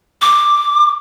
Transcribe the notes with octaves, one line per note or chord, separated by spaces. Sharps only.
D6